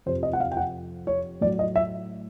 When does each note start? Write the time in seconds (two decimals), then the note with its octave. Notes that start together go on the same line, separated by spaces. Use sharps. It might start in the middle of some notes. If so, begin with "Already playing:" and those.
0.06 F2 C3 F3 C5
0.23 D#5
0.33 F#5
0.40 F5
0.52 G5
0.57 F#5
1.07 C#5
1.41 A2 F#3 D5
1.59 D#5
1.76 E5